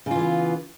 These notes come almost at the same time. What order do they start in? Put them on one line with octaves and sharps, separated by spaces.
C#3 F4 E3 B3